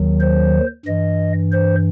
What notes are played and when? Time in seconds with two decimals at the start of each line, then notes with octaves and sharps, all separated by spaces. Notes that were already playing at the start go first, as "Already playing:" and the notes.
Already playing: D#2 D#3 F#3
0.20 C5
0.86 G2 E3 D#5
1.52 C5